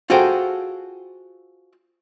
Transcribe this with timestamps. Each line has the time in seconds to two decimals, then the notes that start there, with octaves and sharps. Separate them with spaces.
0.10 F4 F#4 G#4 A4 C5 G5